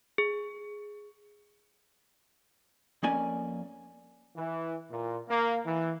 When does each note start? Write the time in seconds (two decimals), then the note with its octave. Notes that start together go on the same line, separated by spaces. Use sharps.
0.18 G#4
3.03 F2 A#3 C#4 D5 G#5
4.36 E3
4.90 A#2
5.29 A#3
5.64 E3